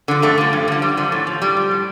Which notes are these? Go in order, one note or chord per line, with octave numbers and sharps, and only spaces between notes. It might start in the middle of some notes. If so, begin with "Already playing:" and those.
D3 F3
G2 A3
D3 F3
G2
D3 F3
G2 G3
D3 F3
A2
F3
A2 G3
F3
A2